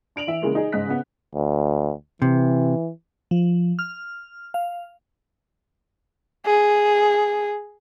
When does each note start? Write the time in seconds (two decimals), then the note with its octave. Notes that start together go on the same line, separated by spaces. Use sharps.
0.16 D4 D7 F7 F#7
0.27 E3 E5
0.42 C#3 E3 G#3 A#3
0.55 D#4 G#4
0.72 G#2 C#3 D#5 F#6 B6
0.87 C#3 B3
1.35 D2
2.22 C3 E3
3.31 F3
3.79 F6
4.54 F5
6.46 G#4